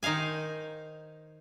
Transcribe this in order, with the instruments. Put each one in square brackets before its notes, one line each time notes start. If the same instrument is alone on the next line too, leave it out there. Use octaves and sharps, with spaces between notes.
[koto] D#3 D#4 C5 F5 G#5